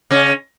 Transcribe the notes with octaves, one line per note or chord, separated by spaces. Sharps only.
C#3 C#4